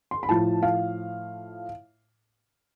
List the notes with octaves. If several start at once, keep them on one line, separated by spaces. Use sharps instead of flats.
C6
B5
A2 F3 A5
F5